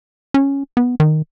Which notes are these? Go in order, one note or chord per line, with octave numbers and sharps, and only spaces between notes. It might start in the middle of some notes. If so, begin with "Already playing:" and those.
C#4
B3
D#3